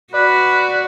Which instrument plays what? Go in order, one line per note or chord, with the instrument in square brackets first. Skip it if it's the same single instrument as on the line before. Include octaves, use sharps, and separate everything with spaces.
[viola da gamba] F#4 [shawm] B4 [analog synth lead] D5